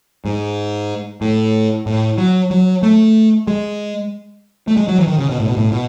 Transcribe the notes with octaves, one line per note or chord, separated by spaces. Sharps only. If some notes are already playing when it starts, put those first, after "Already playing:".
G#2
A2
A2
F#3
F#3
A3
G#3
A3
G#3
F#3
E3
D#3
C#3
B2
A2
B2
A2
B2